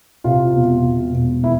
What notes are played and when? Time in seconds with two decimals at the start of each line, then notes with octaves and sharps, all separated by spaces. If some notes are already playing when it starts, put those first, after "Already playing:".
0.24 C3 F4
0.54 E1
0.84 E1
1.13 E1
1.43 E3 E4